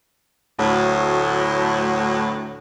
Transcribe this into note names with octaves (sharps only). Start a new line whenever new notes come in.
D2 A2 F#3